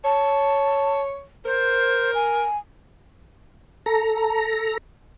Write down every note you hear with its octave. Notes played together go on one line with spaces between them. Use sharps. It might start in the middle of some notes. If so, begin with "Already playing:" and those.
C#5 A5
A#4 C5
G#5
A4 A#5